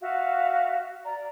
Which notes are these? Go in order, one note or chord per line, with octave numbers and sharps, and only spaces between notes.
F#4 E5 F5
D5 A#5